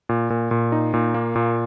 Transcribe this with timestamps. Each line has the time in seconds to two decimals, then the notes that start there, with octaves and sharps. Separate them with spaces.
0.09 A#2
0.30 A#2
0.51 A#2
0.72 D#4
0.94 A#2
1.14 A#3
1.36 A#2